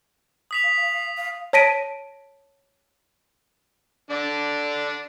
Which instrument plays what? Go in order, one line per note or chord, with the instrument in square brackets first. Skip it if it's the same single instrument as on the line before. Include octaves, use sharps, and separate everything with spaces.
[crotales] D#6 B6 F7
[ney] F5
F5
F5
[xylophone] C#5 A5 A#6 B6 D7 D#7
[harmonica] D3 D4 D5